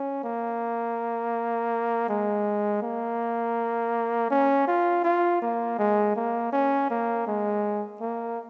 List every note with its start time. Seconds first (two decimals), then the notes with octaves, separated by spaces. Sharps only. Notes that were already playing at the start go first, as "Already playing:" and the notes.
Already playing: C#4
0.24 A#3
2.09 G#3
2.82 A#3
4.31 C#4
4.67 F4
5.04 F4
5.42 A#3
5.79 G#3
6.16 A#3
6.53 C#4
6.90 A#3
7.27 G#3
8.00 A#3